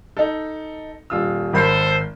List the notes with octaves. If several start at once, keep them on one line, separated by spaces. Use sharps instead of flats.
D#4 A4
D#1 F4 E6
G#1 A4 A#4 C5 B5